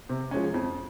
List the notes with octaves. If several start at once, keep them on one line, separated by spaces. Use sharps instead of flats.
C3
F3 G#3 C#4
F2